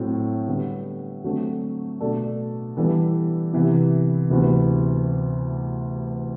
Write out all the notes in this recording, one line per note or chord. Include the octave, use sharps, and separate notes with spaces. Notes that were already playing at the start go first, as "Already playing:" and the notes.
Already playing: A2 F#3 C4
D3 G3 B3
D3 F#3 A3 C4
B2 A3 D4 A4
E3 G3 B3 D4 A4
C3 E3 B3 E4
D2 C3 E3 B3 F#4